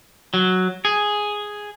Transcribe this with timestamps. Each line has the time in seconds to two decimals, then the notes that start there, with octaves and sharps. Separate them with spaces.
0.34 F#3
0.85 G#4